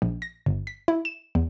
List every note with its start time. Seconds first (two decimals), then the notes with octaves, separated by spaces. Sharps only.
0.02 A#1
0.22 A#6
0.46 G1
0.67 B6
0.88 E4
1.05 E7
1.35 E2